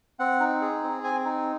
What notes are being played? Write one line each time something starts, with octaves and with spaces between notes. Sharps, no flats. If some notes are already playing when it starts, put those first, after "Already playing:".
C4 F#5
D#4
G#4
C4
C4 G#5
D#4